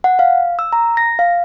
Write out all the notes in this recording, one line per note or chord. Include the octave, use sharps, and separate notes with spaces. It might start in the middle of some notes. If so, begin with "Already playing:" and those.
F#5
F5
E6
A#5
A#6
F5